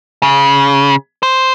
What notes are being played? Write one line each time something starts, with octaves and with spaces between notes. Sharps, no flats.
C#3
C5